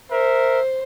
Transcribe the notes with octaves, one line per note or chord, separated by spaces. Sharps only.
A#4 C5 E5